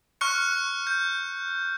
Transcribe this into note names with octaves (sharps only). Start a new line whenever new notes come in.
C#6 F6 F#6 C#7
G6